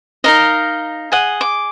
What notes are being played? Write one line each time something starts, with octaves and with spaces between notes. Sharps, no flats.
D#4 A#4 D#5 F5
G#4 D#5 F#5
D6